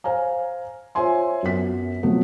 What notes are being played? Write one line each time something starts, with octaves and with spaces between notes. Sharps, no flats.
C5 F5 G#5 A#5
F4 C5 C#5 E5 G#5 C6
F#2 B3 B6
C3 F3 F#3 A3 B3